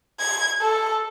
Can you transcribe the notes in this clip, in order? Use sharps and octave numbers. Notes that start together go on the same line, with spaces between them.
G#6
A4